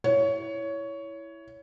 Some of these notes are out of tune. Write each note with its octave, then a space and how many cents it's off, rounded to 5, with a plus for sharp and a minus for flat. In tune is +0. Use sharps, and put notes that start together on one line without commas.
E4 +0 C#5 +15